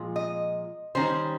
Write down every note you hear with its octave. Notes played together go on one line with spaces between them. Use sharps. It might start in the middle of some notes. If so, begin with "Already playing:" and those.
Already playing: A#2 F3 G#3
D#5
D#3 G3 C#4 C5